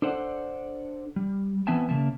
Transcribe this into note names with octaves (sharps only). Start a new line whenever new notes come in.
D4 A4 C5 D5 F#5
G3
E3 B3 C4 E5 G#5 A5
C#3 A#3 E5 A5